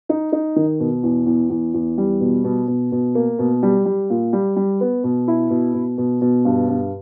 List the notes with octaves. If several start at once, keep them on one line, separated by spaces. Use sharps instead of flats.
D#4
D#4
D#3
B2
E2
E2
E2
E2
G3
B2
B2
B2
B2
A#3
B2
G3
G3
A#2
G3
G3
B3
B2
E4
B2
B2
B2
B2
G2
G2